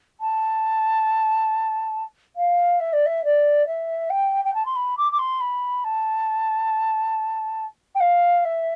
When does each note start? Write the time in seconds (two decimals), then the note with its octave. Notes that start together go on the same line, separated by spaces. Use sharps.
0.20 A5
2.36 F5
2.79 E5
2.92 D5
3.05 E5
3.24 D5
3.66 E5
4.09 G5
4.44 G5
4.54 A5
4.65 C6
4.75 B5
4.97 D6
5.11 D6
5.18 C6
5.40 B5
5.84 A5
7.94 G5
8.00 F5
8.44 E5